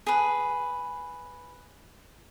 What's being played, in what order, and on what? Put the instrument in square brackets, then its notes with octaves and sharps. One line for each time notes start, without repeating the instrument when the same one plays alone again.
[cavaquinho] G#4 B4